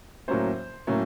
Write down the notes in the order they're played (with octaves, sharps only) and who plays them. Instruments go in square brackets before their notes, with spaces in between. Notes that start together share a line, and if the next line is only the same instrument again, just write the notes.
[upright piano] A2 F#3 A#3 C#4 C5
A2 F#3 A#3 C#4